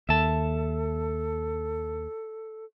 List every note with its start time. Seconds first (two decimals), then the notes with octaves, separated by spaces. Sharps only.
0.09 D#2 A4 E5 A5